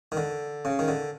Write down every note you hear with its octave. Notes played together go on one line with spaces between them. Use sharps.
D#3
D3
C#3
D#3
D3